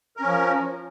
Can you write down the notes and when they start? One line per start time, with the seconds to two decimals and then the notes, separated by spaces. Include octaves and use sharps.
0.17 A#4
0.21 C#4
0.25 F3